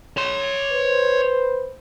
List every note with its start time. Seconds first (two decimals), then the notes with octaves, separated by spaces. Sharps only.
0.17 C#5 C6
0.72 B4 C5